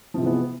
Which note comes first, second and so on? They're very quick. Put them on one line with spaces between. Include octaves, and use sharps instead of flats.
F3 C3 G#3 E3 B3